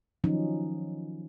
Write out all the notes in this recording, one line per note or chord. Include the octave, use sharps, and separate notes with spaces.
D#3 F3 F#3 C#4 D#4